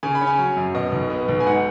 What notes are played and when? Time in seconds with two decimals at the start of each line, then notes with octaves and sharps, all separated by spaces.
0.03 C#3 G#5
0.15 B5
0.21 C#4
0.27 G#5
0.38 F#3
0.57 F#2
0.75 B2 D#5
0.92 B1
1.10 B3
1.28 B1
1.40 G#5
1.46 G#2 F#5